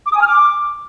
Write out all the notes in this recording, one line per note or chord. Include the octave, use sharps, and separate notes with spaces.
D6
D#6
G#5
F6
D6